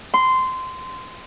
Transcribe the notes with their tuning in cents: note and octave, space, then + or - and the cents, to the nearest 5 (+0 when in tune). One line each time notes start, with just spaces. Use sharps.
C6 -15